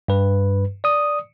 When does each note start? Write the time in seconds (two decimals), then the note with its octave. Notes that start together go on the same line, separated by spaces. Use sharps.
0.08 G2 B4
0.84 D5 D#6